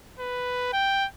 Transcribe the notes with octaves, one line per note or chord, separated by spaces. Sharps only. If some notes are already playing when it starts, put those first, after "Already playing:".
B4
G5